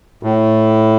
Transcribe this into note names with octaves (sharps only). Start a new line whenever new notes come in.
A2